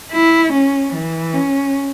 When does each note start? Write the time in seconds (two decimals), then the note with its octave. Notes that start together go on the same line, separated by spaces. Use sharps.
0.12 E4
0.52 C#4
0.94 E3
1.34 C#4